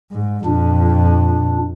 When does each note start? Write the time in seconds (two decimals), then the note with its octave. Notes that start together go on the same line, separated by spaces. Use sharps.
0.12 G#2
0.45 F2 A#2 D4